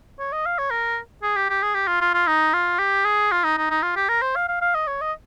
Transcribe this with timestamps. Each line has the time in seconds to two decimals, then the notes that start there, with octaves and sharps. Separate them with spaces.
0.19 C#5
0.33 D#5
0.46 F5
0.59 C#5
0.71 A#4
1.23 G#4
1.36 G4
1.50 G4
1.63 G#4
1.75 G4
1.88 F4
2.01 F4
2.14 F4
2.27 D#4
2.54 F4
2.79 G4
3.05 G#4
3.32 F4
3.44 D#4
3.58 D#4
3.71 D#4
3.83 F4
3.96 G4
4.09 A#4
4.22 C5
4.36 F5
4.49 F5
4.62 F5
4.75 D#5
4.88 C#5
5.02 D#5